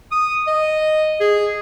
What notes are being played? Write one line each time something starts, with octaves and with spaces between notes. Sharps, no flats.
D#6
D#5
G#4